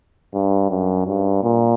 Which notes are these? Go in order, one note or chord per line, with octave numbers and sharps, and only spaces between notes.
G2
F#2
G2
A#2